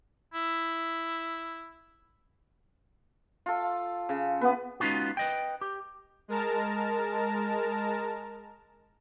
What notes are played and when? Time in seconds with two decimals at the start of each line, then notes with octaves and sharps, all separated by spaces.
0.34 E4
3.46 F4 A4
4.09 C#3
4.41 B3 B4
4.80 G#3 B3 C#4 D#4 F4 F#4
5.17 B4 D#5 G5
5.61 G4
6.28 G#3 A#4 A5 A#5